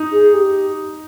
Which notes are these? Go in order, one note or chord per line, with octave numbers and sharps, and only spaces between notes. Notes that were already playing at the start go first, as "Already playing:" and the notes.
Already playing: D#4
G#4
G4